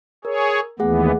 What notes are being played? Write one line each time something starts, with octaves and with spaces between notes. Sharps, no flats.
G#4 A#4 C#5
D#2 E3 A3 B3 G#4 F#5